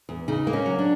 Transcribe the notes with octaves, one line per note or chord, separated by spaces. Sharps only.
E2
C#3 D#4
A#3
C#4
F#3
D4